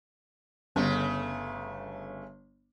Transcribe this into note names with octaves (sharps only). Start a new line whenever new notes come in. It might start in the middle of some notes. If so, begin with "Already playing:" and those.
G1 C#3 A3